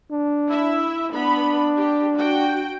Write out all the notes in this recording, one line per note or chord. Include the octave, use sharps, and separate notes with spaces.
D4
E4 E5
B3 D4 B5
G4
F#4 G5